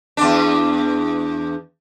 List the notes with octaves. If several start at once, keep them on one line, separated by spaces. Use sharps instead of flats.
E2 D4